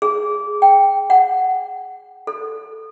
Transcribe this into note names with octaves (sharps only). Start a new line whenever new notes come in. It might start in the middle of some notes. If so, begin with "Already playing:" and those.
G#4
G5
F#5
A4